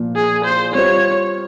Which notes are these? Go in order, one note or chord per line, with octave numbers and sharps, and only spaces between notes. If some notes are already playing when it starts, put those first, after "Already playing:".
Already playing: A#2 F3 A#3 F4
G#4
C5
G3 C4 F4 C5 C#5